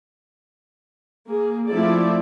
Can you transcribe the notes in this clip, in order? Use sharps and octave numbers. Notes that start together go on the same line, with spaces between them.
A#3 G#4
F3 A3 C4 E4 A4 D5